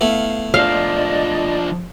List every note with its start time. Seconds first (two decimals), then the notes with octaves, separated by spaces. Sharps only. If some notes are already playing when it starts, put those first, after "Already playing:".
0.01 A3 B3 E4 F5
0.54 F3 D4 D5 D#5 F5